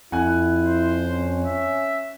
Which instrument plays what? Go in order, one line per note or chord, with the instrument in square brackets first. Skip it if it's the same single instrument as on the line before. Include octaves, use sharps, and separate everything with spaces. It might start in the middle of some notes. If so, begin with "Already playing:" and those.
[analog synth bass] F2 [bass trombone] E4 [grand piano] F#5 G#5 F#6
[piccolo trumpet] C5
[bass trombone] C#4
[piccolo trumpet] E5